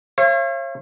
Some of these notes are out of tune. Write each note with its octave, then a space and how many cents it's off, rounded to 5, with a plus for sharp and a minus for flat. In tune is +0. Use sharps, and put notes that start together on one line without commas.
C#5 -40 F5 -45